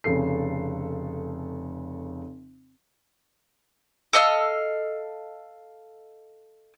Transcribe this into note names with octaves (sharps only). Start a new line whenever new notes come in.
F1 C#3 A4 C7
A4 D#5 F5 E6